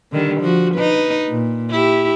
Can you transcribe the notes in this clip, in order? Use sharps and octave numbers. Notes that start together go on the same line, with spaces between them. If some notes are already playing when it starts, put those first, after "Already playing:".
D3 D#3 G3
F3 F#4
D#4 B4
A#2
E4 G4